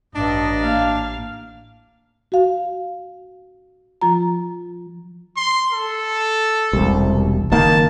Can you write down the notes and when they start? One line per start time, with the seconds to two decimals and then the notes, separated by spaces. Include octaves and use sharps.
0.15 A1 G2 D4 D#5
0.64 A#3 F5
2.32 F#4 F5
4.02 F3 F4 A#5
5.37 C6
5.73 A4
6.73 E1 C2
7.51 F#1 D#3 A#3 A5